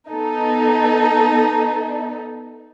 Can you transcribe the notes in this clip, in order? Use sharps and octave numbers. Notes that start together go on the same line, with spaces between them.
B3 D#4 A4